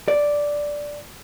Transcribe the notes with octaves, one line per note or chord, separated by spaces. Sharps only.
D5